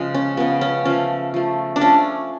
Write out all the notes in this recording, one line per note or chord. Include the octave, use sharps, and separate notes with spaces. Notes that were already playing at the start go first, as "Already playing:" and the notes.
Already playing: C#3 F3 G#3
C#4
C#3 F3 G#3 B3
C#4
F3 A3 C#4
F3 A3
D4
F3 A3 C#4